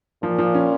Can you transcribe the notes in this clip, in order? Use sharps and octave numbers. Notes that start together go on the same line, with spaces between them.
A#2 F3
F3
C#4